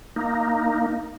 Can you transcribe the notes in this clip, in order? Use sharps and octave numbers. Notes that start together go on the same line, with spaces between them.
A#3 D#4